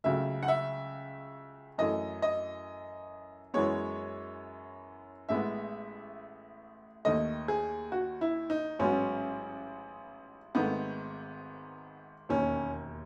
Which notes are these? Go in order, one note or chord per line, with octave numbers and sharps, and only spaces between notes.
C#2 C#3 F#3 A3 E5
F#5
E5
F#2 E3 A3 D#5
D#5
F#2 E3 G#3 B3 C#5
A1 A2 G#3 B3 E5
D#2 D#3 A3 D#5
G#4
F#4
E4
D#4
A1 G#2 F#3 B3 C#4
G#1 G#2 D#3 A3 B3
E1 D#2 D#3 C#4